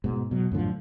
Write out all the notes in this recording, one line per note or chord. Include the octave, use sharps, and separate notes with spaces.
G#2 B2
B2 F#3
F#2 A2 D3 F3